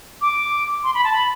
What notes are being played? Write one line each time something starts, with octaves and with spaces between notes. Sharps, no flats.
D6
C6
B5
A5
B5